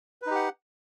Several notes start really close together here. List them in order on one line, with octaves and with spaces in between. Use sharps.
B4 D#4 G4 F#5